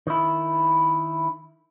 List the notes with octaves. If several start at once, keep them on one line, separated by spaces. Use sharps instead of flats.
D#3 E4